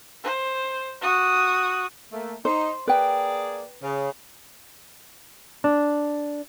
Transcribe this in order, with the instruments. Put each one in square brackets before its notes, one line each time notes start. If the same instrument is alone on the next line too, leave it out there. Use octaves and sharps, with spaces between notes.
[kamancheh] C5
F#4 D#6
[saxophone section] A3 A#3
[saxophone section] D#4 [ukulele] C5
[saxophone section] A#3 G#4 D5 [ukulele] B4 G5
[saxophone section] C#3
[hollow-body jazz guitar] D4